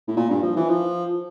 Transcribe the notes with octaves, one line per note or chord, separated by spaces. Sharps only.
A2
A#2
G2
F3
E3
F3